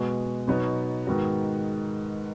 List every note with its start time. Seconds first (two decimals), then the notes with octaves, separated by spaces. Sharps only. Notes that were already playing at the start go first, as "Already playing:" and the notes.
Already playing: B2 G#3 B3 F#4
0.47 B2 F#3 B3 D#4 F#4
1.07 G#2 D#3 B3 D#4 F#4